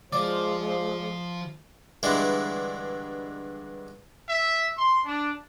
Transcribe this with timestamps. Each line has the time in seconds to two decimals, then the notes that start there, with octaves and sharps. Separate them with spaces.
0.13 F3 G#3 F4 C5 D5
2.03 G2 D3 E3 G#3 E4
4.27 E5
4.76 C6
5.05 D4